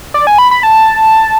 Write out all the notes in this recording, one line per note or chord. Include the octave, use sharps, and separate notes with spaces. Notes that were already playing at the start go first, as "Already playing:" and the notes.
D5
G#5
B5
B5
A5